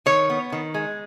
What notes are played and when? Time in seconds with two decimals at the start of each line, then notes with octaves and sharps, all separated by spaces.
0.06 D#3 C#5
0.30 B3
0.52 D#3
0.74 G#3